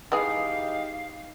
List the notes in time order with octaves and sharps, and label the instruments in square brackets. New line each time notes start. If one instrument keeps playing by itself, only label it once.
[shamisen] E3 G#3 G#4 [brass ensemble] D#4 G4 [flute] F5